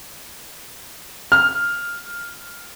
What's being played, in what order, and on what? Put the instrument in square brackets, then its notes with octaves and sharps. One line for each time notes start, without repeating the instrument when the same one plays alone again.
[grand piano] F6